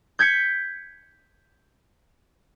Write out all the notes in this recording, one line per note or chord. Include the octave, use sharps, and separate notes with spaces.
G6 G#6 B6 C#7